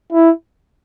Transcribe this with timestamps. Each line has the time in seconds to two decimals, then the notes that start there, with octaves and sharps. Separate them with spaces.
0.12 E4